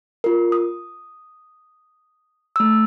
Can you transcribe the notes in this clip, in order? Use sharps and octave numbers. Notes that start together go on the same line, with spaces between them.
F4 A#4
D#6
A3 E6